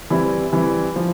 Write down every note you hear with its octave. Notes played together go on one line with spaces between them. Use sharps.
E3 G3 C4 E4
E3 G3 C4 E4
F3